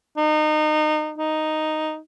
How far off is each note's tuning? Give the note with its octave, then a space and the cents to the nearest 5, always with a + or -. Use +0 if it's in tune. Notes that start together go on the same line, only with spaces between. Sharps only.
D#4 -25
D#4 +0